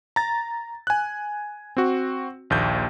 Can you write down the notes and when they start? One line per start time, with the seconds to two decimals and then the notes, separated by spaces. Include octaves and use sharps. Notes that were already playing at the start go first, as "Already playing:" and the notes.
0.16 A#5 A6
0.87 G#5 F#6
1.77 C4 F#4
2.50 A#1 D#2 G6